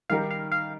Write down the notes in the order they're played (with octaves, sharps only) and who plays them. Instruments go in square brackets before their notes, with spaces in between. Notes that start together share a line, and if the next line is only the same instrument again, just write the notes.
[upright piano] D#3 G3 D#4 G4 A#4 [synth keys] F5
[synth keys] F5
F5